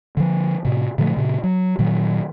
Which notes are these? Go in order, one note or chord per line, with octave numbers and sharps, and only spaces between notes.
D3 F3
A2 C3
A#2 D3 F3 A3
A#2 C#3
F#3
A#2 D#3 F#3